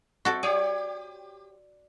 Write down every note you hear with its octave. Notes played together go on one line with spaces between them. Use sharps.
C4 F#4 A4 E5
G4 C#5 D5